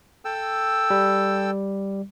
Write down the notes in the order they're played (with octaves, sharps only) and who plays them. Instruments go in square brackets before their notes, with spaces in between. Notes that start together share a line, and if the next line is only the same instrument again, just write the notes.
[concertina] A4 G5 E6
[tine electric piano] G3